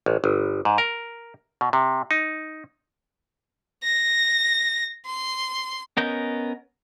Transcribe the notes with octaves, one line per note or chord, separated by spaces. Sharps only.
A1
G1
G#2
A#4
B2
C3
D#4
A#6
C6
B3 C#4 A#4 D#5 G6